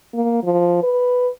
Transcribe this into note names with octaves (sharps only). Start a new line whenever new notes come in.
A#3
F3
B4